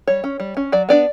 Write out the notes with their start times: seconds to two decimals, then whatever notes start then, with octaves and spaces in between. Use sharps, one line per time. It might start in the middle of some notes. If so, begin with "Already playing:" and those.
0.07 G3 C#5
0.24 C#4
0.40 G3
0.57 C#4
0.72 F#3 D5
0.89 B3 D4 D5